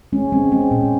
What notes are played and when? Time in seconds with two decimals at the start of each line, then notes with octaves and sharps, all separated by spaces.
0.12 G#3 C#4
0.32 G#3 C4
0.52 G#3 C4
0.71 A#2 C#4